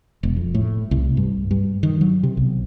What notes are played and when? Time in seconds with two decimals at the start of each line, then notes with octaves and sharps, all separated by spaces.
0.23 E1
0.36 F2
0.54 A2
0.91 C2
1.17 G2
1.51 G2
1.83 D#3
2.01 F#3
2.23 C3
2.37 B1